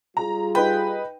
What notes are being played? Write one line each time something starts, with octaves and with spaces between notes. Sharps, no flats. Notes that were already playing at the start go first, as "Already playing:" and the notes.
G3 F4 G#4 A#5
D#4 B4 G5 B5